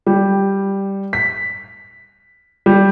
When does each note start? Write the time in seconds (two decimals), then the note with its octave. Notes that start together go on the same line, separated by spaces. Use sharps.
0.07 G3
1.13 B6
2.66 G3